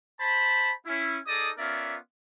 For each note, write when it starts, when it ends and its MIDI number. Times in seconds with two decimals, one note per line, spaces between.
0.20 0.71 72
0.20 0.71 81
0.20 0.71 83
0.86 1.17 61
0.86 1.17 64
1.27 1.51 63
1.27 1.51 68
1.27 1.51 69
1.27 1.51 74
1.27 1.51 75
1.27 1.51 87
1.58 1.96 59
1.58 1.96 61
1.58 1.96 65
1.58 1.96 70
1.58 1.96 74
1.58 1.96 76